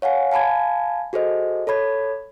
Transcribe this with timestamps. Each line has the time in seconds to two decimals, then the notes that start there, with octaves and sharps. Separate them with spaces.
0.02 C#5 F5 F#5 G#5
0.32 F5 G#5 A5 B5 G#6
1.13 F#4 G#4 A4 C5 D#5
1.67 A4 C#5 B5 G#6